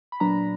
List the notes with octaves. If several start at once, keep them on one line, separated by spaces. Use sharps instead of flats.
B5
A#2 F#3 B3 D4 A#5